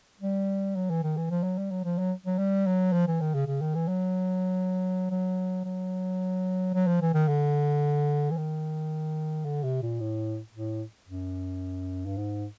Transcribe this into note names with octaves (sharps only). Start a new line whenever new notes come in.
G3
F#3
E3
D#3
E3
F3
F#3
G3
F#3
F3
F#3
F#3
G3
F#3
F3
E3
D#3
C#3
C#3
D#3
E3
F#3
F#3
F#3
F#3
F3
E3
D#3
D3
E3
D#3
D3
C3
A#2
A2
A2
F#2
G2
G#2